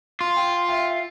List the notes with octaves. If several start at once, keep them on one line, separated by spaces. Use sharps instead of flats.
F4
G5
E5 F5 G5